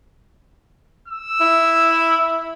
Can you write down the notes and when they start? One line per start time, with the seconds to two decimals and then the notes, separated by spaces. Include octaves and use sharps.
1.08 E6
1.41 E4